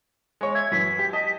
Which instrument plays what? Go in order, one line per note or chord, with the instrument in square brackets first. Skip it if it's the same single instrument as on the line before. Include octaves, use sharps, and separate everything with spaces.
[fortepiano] G#3 C#5
[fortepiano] E5 [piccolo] G#6
[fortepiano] F#2 E3 [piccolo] B6
[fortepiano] G4
D#5 A5